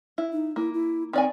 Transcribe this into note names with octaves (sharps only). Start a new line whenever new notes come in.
E4
D#4
A#3 E4
E4
D#3 C4 D5 G#5